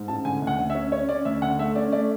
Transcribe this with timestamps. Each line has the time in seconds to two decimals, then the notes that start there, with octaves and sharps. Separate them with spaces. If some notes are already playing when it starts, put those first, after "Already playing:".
Already playing: G#2
0.08 A1 A5
0.25 D3 G#5
0.42 D2
0.47 F#5
0.58 D2
0.70 E5
0.75 C#4
0.92 C#4 C#5
1.09 C#4 D5
1.25 D2 E5
1.42 D3 F#5
1.59 A3 E5
1.76 C#4 D5
1.92 A3 D5